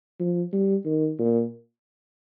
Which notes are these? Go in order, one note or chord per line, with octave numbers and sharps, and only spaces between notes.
F3
G3
D#3
A#2